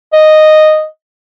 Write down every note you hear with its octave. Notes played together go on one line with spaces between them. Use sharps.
D#5